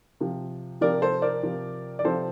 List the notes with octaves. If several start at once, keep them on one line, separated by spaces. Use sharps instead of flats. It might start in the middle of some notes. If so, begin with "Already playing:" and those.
C3 F3
C3 F3 A#4 D5
A4 C5
A#4 D5
C3 F3
D5
C3 F3 A4 C5